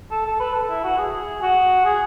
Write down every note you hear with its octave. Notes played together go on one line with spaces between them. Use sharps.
A4
A4
B4
A4
E4
F#4
G#4
F#4
G#4